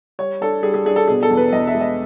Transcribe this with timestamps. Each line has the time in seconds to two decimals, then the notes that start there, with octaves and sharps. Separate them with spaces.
0.19 G3 C#5
0.41 D4 A4
0.63 G3 G#4
0.74 G#4
0.85 D4 G#4
0.96 A4
1.08 B2 G#4
1.23 A4
1.30 E2
1.37 B4
1.52 E2 D#5
1.67 E5
1.74 G#3
1.81 D#5